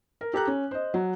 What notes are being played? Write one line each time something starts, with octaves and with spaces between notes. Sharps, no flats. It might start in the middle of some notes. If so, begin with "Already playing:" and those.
A#4
G4 A4 A#5 F#6
C#4
C5 D#5
F#3